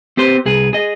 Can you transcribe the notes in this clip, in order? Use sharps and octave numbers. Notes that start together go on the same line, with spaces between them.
C4 G4 B4 C5
C2 G#4 B4
G#4 D#5